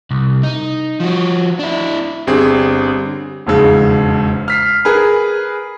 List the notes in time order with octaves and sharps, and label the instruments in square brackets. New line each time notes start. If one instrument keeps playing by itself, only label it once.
[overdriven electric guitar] C2
D#4
F3 F#4
D4 E4
[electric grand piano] G1 C4 G#4 [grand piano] D3 G3
[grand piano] E1 F2 G#2 C#3
F6 B6 C7
G#4 A#4 B4